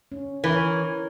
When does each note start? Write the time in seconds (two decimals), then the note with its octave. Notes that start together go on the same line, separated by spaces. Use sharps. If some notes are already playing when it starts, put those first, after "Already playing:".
0.12 C#4
0.44 E3 A#4 C#5